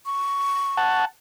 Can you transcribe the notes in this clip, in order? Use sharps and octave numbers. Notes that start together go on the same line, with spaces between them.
C#6
F#5 A5